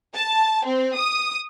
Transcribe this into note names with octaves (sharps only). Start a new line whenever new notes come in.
A5
C4
D#6